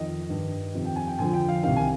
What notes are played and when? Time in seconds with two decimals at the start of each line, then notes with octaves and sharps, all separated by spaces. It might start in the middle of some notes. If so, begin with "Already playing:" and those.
Already playing: F2 D#3 D#5
0.29 G2 D#3
0.74 F2 C3 D#3
0.85 G5
0.96 G#5
1.08 G5
1.18 F2 D3 F3 G#5
1.33 G5
1.48 F5
1.63 C2 C3 D#3 F5
1.76 G#5